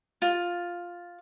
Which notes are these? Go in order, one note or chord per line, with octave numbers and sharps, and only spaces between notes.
F4